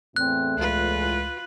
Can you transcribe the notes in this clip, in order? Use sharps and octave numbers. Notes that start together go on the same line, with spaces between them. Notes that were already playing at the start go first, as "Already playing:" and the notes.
E2 A2 C4 F#6
C#2 F4 B4